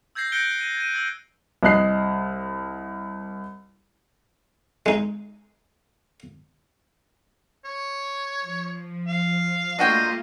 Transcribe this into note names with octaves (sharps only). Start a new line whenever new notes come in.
E6 G6 G#6 A#6 C7
F#6 G6 A#6 C#7 D7 G7
D#7
G#6 D#7
E6 G#6
C2 D#5 F#6 C7
G#3 D#4
C#5
F3
F5
A3 A#3 D4 F4 F#4 D#5 G5